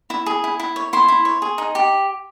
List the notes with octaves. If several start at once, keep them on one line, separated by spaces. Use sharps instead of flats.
E4
G#4
E4
E4
C#5
E4 C6
E4
C#5
G#4
D#4
G4